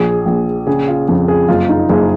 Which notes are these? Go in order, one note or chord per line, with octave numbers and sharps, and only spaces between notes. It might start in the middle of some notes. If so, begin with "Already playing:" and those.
Already playing: A#1 G#4
A#1
C#3 G#4
F4
F2
G#4
F#1 F4
D#4
F#1 G#4